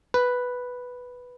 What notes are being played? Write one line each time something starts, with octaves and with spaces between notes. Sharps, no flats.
B4